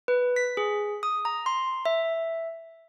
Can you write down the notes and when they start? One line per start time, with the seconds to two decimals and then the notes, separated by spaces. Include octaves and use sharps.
0.08 B4
0.36 B6
0.57 G#4
1.03 D#6
1.25 A#5
1.46 C6
1.85 E5